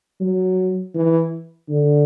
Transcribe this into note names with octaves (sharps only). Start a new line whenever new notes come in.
F#3
E3
D3